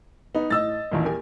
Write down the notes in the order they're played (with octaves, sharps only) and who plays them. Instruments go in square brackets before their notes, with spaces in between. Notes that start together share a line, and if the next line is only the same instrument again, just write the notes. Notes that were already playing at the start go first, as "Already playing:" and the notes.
[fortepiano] B3 [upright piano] D#4
[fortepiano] A2 [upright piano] D#5 E6 A6
[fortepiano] A1 D#2 A#2
A#3 G4 G#5